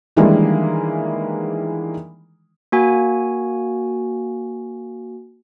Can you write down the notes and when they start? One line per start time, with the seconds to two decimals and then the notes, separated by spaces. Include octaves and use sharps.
0.16 D#3 E3 G3 G#3 A#3 D4
2.72 A#3 F#4 G#5